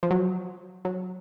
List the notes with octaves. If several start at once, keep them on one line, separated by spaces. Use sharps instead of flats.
F3
F#3
F#3